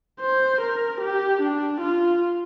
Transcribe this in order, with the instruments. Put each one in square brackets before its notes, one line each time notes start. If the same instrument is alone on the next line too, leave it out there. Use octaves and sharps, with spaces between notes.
[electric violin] C5
A#4
G4
D4
F4